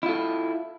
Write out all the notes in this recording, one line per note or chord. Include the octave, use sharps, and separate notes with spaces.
E4 F4 A4